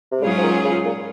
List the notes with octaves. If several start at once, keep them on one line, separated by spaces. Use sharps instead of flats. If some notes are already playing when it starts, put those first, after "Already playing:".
C3
G#2 C#3 F#3 C#4 F4 G#4
F3
D#3
C#3
A#2